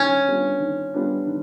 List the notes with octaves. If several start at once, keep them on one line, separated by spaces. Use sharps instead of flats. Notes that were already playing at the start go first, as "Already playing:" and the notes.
Already playing: D#3 G3 C#4 D4
G3 B3 D4 F4
D#3
G3 B3 D4 F4
D#3